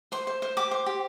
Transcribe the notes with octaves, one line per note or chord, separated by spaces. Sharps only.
C5 C6
C5
C5
G4 D6
C5
G4